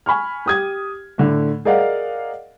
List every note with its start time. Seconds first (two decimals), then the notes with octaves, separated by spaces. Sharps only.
0.06 G#5 B5 C#6 F6
0.46 G4 D#6 G#6
1.18 A2 D3 A3
1.65 G#4 A#4 D5 D#5 F5 F#5